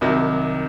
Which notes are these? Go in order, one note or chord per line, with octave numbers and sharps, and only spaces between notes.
C2 C3 D#3 F#3